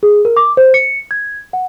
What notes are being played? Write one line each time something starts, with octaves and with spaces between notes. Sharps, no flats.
G#4
A#4
D6
C5
C#7
G#6
F#5